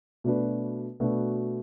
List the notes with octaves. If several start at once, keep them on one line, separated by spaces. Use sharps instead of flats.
B2 A3 D4 F#4 B4
B2 A3 D4 F#4 B4